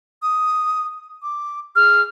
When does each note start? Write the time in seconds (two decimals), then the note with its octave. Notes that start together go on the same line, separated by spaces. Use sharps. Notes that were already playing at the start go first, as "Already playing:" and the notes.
0.22 D#6
1.22 D6
1.76 G#4 F6